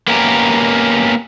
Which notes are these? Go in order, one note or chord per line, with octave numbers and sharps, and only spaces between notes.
A#3 B3 C#4 G4 A#4